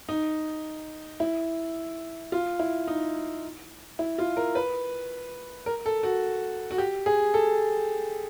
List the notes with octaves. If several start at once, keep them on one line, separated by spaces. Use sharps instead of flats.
D#4
E4
F4
E4
D#4
E4
F4
A#4
B4
A#4
A4
F#4
F#4
G4
G#4
A4